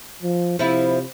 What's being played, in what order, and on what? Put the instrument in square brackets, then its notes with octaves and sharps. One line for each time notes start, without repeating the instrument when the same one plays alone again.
[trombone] F3
[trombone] C3 [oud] F3 E4